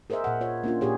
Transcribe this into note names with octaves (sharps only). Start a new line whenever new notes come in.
G#4 A#4 C5 D#5 E5
A#2 F#5
F4 C#5
A#3 C#4 D4 F4
A#2 D4 G4 G#4 C#5